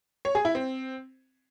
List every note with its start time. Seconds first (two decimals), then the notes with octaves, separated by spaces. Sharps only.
0.25 C#5
0.35 G#4
0.45 E4
0.55 C4